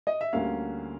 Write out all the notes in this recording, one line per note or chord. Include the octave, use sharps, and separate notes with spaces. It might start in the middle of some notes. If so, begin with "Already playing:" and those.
D#5
E5
D2 D3 G3 A#3 C#4 F5